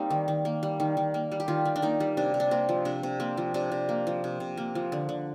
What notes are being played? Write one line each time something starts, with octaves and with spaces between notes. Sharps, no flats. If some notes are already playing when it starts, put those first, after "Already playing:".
Already playing: G3 A#3 C4 D#4
D#3
D#3
A#3
G3
D#3
D#3
A#3
G3
G4
D#3 F4
D#3
D4
A#3 D#4
G3
C3 D4
C3
D4
A#3 C4
F3
C3 D4
C3
A#3 C4
F3
C3 D4
C3
A#3
F3
C3
C3
A#3
F3
D3
D3